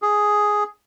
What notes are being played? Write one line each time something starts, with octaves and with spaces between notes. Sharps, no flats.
G#4